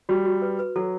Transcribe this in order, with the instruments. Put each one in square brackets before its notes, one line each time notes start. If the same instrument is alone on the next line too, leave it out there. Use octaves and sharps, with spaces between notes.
[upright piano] G3 [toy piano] F#4
[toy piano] F#4
B4
B4
[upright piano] F#3 [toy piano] A4